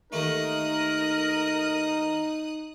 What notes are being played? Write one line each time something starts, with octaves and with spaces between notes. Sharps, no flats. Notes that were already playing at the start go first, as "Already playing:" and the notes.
D#2 A3 D#4 A#4 D#6 F#6